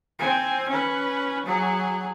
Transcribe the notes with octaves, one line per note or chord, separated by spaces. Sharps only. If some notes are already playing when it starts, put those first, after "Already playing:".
C4 G#5
C#4 B4
F#3 G#4